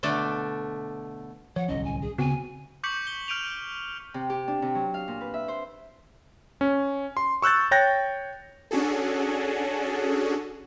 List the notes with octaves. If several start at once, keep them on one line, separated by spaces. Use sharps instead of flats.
B2 D3 A3 D4 A4
F3 C#5 F#5
D1 C2 C#4 D#5
G#5
G#4
D2 C#3 B3 C4 F#4 G#5
C#6 D6 G6 B6 C#7 F#7
G7
F6 G6 D7 D#7 F7
C3
G4
D4
C3
F#3
F5
A#2
B4
E5
C5
C#4
C6
C#6 E6 F#6 G6 A6
C#5 G5 F#6 G6 A6 A#6
C#4 D4 F#4 G#4 A4